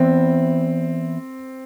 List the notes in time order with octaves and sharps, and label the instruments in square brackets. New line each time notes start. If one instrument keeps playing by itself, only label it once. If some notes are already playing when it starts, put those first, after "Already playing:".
Already playing: [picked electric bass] E3 B3 [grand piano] C4